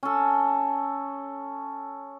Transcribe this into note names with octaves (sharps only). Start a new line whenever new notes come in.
C#4 A4